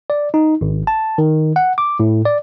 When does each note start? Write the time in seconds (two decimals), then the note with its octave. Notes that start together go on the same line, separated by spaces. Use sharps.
0.10 D5
0.34 D#4
0.61 G#1
0.87 A5
1.18 D#3
1.56 F#5
1.78 D6
2.00 A2
2.25 D5